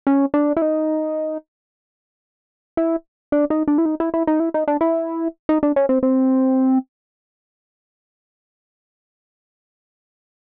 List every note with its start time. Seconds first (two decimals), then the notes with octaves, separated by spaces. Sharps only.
0.07 C#4
0.34 D4
0.57 E4
0.62 D#4
2.77 E4
3.32 D4
3.50 D#4
3.68 D4
3.78 E4
3.86 D#4
4.00 E4
4.14 E4
4.27 D#4
4.40 E4
4.54 D#4
4.68 D4
4.81 E4
5.49 D#4
5.63 D4
5.76 C#4
5.89 C4
6.03 C4